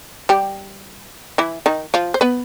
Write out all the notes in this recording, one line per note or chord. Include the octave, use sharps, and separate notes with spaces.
G3 G4
E3 E4
D#3 D#4
F3 F4
C5
B3 B4